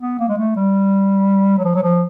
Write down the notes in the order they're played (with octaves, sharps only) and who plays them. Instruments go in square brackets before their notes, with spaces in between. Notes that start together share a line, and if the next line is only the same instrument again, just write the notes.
[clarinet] B3
A#3
G#3
A3
G3
F#3
F3
F#3
F3